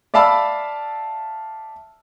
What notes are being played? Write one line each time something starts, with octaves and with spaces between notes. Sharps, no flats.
D5 E5 F5 A5 B5 E6